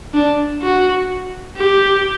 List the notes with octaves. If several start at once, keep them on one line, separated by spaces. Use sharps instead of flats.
D4
F#4
G4